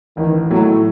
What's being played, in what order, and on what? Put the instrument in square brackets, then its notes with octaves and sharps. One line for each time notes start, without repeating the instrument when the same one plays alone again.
[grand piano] A1 [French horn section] D#3
[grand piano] A2 A3 [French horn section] F#3